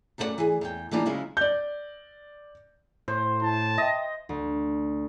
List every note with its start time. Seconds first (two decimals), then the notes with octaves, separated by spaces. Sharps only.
0.18 F#2 A3 D4 F4 D5 F#5
0.38 E3 G#4
0.61 E2 G5
0.91 E3 G3 A#3 D4 D#4 F4
1.06 C#3 F#3 G#3 E4 F4
1.37 D5 G6
3.08 A2 C5
3.42 E4 A5
3.78 D#5 E5 G5
4.29 D2